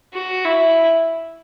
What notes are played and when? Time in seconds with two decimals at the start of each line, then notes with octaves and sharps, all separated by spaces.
0.14 F#4
0.45 E4